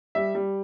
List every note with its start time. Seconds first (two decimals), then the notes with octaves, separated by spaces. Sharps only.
0.15 G3 E5
0.35 G3